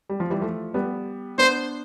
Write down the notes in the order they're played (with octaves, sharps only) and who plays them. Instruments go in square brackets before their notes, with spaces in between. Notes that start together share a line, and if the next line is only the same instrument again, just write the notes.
[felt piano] G3
F3
E3 G3
F3 A3
G3 B3
[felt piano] B3 D4 [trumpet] C5